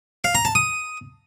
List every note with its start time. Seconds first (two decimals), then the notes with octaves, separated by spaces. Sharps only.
0.24 F5
0.35 A#5
0.45 A5
0.55 D#6